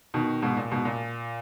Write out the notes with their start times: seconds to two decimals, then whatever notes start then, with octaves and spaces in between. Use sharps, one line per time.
0.14 B2 D#3
0.42 G#2 B2
0.57 A#2
0.71 G#2 B2
0.85 A#2